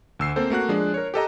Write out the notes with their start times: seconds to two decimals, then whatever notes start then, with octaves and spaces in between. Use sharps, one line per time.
0.19 D2 E6 C7
0.36 A#3 C4 A4 C5
0.50 A3 A#3 F#4 F#6
0.68 F3 G#3 D4
0.94 A#4 C#5
1.14 G4 A4 D#5 A#5